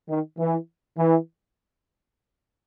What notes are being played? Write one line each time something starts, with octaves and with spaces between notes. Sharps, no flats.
D#3
E3
E3